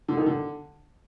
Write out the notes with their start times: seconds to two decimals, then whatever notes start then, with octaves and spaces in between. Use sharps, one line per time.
0.08 D3
0.17 D#3
0.26 D3